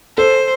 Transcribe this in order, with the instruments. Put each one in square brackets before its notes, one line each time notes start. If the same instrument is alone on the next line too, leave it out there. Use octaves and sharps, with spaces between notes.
[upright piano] A4 [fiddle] C5